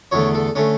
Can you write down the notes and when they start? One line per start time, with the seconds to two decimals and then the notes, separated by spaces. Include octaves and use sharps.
0.11 E2 D3 A3 C#5
0.34 A4
0.55 D3 A3 C#4